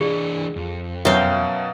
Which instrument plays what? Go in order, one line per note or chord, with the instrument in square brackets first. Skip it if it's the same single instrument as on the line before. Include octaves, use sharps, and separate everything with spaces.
[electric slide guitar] E3 D4 [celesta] G#4
[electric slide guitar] F2
[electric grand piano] F#2 B2 F#3 [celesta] C#5 E5 [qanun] F5 G5